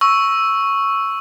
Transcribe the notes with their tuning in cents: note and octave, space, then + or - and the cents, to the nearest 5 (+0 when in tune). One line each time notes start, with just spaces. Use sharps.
C#6 +0 E6 +0